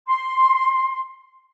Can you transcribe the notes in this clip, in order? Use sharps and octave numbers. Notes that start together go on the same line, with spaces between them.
C6